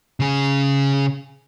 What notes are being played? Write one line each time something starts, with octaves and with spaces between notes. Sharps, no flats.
C#3 G#4